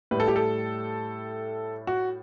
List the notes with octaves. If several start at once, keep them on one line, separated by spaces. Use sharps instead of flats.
A2 G3 B4
A4
G4
A4
F#4